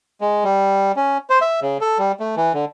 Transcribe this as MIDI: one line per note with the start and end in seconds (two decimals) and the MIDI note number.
0.21 0.44 56
0.44 0.92 55
0.96 1.18 61
1.30 1.39 72
1.41 1.60 76
1.62 1.78 49
1.81 1.98 69
1.99 2.12 55
2.20 2.35 57
2.37 2.53 52
2.54 2.65 50